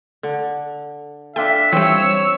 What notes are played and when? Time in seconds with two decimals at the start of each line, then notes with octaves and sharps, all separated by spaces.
0.23 D3
1.36 D4 F4 A4 E5 G5
1.73 E3 G3 C4 C#5 E6